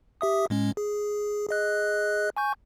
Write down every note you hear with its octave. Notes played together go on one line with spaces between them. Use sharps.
G4 E5 D#6
A2 G#3 C#4
G#4
G#4 D#5 F#6
G#5 C#6 G6